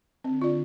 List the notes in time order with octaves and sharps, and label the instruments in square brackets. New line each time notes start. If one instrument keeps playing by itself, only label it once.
[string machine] D3 [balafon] C4
[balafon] F4 D5